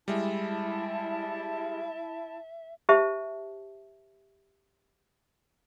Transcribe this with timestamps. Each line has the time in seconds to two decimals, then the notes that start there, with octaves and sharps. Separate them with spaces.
0.08 G3 G#3 E4 E5 A5
2.89 G4 C5 E5 A5